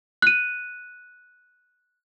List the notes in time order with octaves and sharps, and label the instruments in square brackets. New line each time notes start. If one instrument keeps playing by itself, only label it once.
[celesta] F#6 D#7